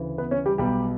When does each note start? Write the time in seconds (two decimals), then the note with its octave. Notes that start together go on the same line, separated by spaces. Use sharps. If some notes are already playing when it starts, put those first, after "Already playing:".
Already playing: D2 C#3 E3
0.18 B3 B4
0.31 C#4 C#5
0.46 G3 G4
0.58 B1 B2 G3 G4